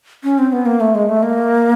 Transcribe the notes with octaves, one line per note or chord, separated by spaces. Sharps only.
C#4
C4
B3
A#3
A3
G#3
A3
A#3